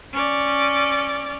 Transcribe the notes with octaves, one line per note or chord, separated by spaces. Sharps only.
C#4 D5